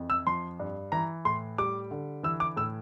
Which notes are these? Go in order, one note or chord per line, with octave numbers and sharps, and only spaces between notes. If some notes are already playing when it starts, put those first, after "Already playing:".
Already playing: F2 E3
E6
F3 C6
G2
E3 A#5
A2 C6
G3 D6
D3
E3 E6
D6
A2 E6